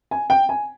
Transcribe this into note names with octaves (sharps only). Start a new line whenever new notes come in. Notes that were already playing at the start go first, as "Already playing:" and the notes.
G#5
G5
G#5